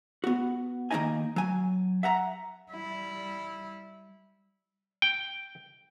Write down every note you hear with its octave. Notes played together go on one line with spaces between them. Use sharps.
B3 F#4
D#3 A#3 C#4 D#4 D#5 G#5
F#3 G#5
E5 F#5 A#5
G3 E4
G5